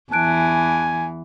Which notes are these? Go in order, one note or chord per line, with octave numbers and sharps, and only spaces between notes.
E2 E3 G#5 A5 F#6 D7